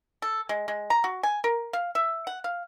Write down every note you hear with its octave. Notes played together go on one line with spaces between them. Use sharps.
A4
G#3
G#3
A#5
F#4
G#5
A#4
F5
E5
F#5
F5